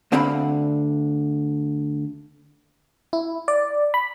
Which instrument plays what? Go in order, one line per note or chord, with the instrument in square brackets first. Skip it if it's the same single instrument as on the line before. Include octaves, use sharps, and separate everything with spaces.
[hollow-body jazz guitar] D2 D3 C4 F5 F#5 B5
[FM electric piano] E4
D5
B5